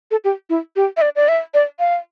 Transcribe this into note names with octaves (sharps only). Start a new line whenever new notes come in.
A4
G4
E4
G4
E5
D5
D5
E5
D5
F5